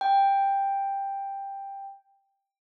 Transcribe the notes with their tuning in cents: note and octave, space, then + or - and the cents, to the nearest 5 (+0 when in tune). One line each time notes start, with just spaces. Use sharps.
G5 +10